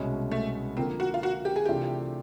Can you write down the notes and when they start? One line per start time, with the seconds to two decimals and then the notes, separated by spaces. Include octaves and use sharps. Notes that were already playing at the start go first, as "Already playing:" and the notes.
Already playing: C2 B2 G#3 C#4
0.31 A3
0.77 D3 F3 A#3 C4
1.00 F#4
1.14 F4
1.23 F#4
1.45 G4
1.56 G#4
1.65 C3 E3 A3 D4 F4 G4